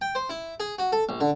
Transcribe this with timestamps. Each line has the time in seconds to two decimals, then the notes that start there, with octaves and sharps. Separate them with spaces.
0.01 G5
0.15 C5
0.30 E4
0.60 G#4
0.78 F#4
0.92 A4
1.09 A#1
1.21 D3